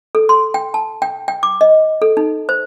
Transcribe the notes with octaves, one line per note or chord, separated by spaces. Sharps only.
A4
C6
G5
A5
G5
G5
D6
D#5
A4
D#4
C5